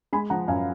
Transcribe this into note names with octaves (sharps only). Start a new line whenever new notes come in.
G#3 G#5 B5
F3 F#5 A#5
F#2 F5 G#5